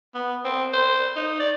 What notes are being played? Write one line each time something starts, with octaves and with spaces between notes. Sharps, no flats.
B3
C4
C5
D#4
D5